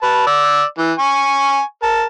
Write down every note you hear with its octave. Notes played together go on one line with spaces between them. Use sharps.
B4 A5
D5 E6
E3
G#5 C#6
A#4 A5